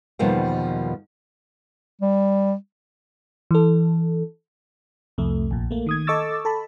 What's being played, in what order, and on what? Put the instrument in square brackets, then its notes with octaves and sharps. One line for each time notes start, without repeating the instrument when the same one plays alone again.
[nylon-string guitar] E2 B2 D#3 F3 G3 A#3
[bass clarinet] G3
[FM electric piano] E3 A4
C2 F2 A3
A#1 A#2
A3 A#3
D#3 D#6 G#6
A4 D#5 C#6 D6 E6 A6
A4 A5 B5